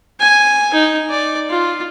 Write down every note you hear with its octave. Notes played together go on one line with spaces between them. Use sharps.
G#5
D#4
D5
F4